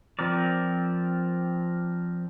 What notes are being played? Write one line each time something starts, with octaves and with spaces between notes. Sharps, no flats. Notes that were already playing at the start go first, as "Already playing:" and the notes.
F3 C4 A#4 D5